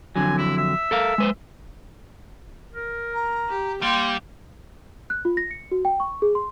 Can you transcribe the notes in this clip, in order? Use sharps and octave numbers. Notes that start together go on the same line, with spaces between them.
F2 D3 F#3 G#5
E4
E5
A4 A#4 F5
G#3 B4 C5
A#4
A#5
G4
G3 A#3 G5 C6
F#6
F4
A#6
C#7
F#4
G5
C#6
G#4
C6